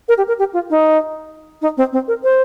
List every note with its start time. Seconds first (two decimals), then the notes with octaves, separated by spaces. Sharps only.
0.08 A#4
0.18 G4
0.28 A#4
0.39 G4
0.53 F4
0.70 D#4
1.62 D#4
1.77 C4
1.93 C4
2.08 A#4
2.24 C5